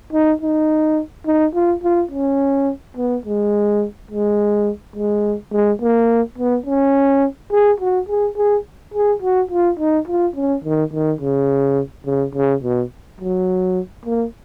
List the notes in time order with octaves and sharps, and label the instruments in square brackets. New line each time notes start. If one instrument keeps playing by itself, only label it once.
[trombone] D#4
D#4
D#4
F4
F4
C#4
B3
G#3
G#3
G#3
G#3
A#3
B3
C#4
G#4
F#4
G#4
G#4
G#4
F#4
F4
D#4
F4
C#4
D#3
D#3
C#3
C#3
C#3
B2
F#3
A#3